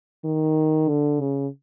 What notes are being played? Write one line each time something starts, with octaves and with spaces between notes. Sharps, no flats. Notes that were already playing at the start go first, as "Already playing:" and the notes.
D#3
D3
C#3